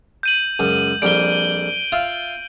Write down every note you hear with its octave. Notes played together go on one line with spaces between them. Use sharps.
G6 D#7 F#7
C#2 F#2
A#1 F2 G3 D7 G7
F4 E5 F5